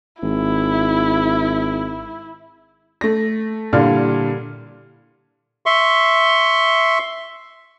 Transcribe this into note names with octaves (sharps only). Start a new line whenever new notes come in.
G#1 E4
A3 A#6
A#2 D3 G3 E4 F5 F6
E5 C6 C#6